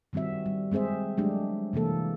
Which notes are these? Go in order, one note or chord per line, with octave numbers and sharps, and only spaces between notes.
D#3 G3 C4 F#4 E5
G3
G#3 C4 G#4 C5 E5
F#3 G#3 A3 D4 G4
C3 E3 A#3 A4